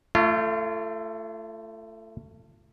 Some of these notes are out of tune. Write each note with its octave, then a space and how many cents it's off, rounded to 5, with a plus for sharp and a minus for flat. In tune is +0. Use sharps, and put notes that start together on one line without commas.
A3 +15 F4 -30